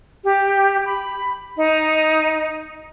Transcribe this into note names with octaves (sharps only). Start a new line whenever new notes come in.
G4
B5
D#4